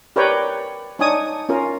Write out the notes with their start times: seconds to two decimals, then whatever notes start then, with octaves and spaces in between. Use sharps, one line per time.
0.16 G4 A#4 B4 C#5 D5 G5
0.99 D4 D#4 C#5 G#5 D#6
1.49 C#4 F4 A#4